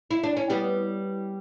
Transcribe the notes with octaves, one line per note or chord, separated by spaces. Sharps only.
E4
D4
C#4
G3 B3